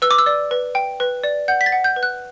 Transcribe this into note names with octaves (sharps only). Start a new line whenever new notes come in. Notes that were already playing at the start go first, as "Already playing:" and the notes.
B4 E6
D6
E6
D5
B4
G5
B4
D5
F#5 G6
B6
A6
F#5
G6
B4
F#6